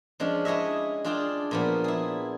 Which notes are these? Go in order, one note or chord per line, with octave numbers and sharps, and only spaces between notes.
F3 G#3 C#4 D4
E4 G#4 C#5 D#5 E5
D4 F4 G#4 D5 G5 A5
A#2 F3 B3
E4 G#4